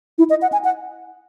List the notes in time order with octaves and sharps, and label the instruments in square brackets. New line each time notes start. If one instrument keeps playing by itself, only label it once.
[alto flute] E4
D#5
F#5
G#5
F#5